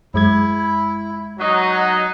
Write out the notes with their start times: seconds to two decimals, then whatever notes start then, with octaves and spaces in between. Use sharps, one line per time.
0.14 F#2 G#3 E4 G#6
1.39 F#3 D#4 F#4 D#5